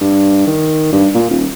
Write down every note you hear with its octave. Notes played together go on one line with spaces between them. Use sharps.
G2
D#3
G2
A#2
D#1